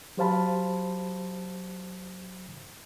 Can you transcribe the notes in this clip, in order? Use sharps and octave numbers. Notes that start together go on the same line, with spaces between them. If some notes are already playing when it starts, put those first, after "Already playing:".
F#3 G4 C5 F5 A5 B5